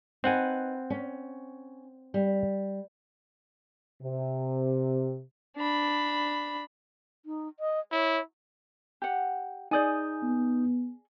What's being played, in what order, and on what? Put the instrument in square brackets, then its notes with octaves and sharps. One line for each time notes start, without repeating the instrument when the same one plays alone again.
[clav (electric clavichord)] C4 F#5 G#5 [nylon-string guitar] D#4 B4
[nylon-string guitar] C#4
G3
[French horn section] C3
[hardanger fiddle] D4 B5
[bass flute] D#4
D#5
[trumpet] E4 [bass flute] C#5
[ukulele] G4 F#5
[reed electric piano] D#4 D#6 G6 [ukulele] G#4 D5 G#5
[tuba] B3